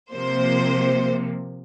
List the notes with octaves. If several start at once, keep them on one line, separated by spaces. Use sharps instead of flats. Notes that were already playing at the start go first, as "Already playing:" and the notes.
C3 F3 A#3 C5